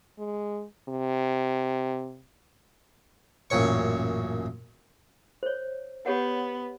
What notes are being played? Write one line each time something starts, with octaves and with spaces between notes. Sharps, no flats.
G#3
C3
A1 F#2 A#2 C#5 C#6
C5 C#5
B3 G4 C#5 F#5